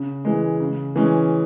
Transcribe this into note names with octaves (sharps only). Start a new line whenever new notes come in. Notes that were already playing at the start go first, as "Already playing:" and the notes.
Already playing: C#3
E3 G#3
C#3
E3 G#3 C#4